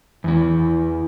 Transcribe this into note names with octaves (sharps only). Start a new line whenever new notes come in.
E2 E3